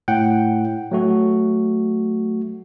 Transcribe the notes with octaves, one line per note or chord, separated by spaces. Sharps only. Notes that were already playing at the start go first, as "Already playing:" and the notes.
A2 F#5 G5
F#3 A3 F#4